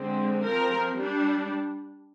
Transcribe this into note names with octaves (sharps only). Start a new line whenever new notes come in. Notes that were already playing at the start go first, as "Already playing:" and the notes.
Already playing: D3 G#3 C4
F3 C4 A#4
G3 D4